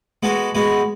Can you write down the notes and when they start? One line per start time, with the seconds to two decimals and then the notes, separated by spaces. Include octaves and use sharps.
0.23 G#3 B3 F#4 A4
0.55 G#3 B3 F#4